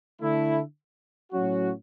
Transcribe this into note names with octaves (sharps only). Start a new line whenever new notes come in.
D3 A3 E4
A2 F#3 C#4 F#4